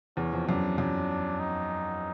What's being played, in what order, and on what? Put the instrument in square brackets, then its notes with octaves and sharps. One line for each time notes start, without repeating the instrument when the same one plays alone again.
[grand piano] E2 [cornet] C#4
[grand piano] F2
[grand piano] F#2 [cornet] D4
[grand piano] F#2 [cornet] D4
[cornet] D#4